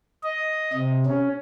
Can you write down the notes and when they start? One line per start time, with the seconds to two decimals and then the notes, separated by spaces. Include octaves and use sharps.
0.23 D#5
0.73 C3
1.06 C#4